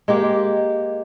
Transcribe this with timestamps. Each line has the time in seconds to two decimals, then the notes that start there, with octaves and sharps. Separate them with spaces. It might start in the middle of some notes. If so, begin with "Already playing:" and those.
0.08 G#3 A#3 G4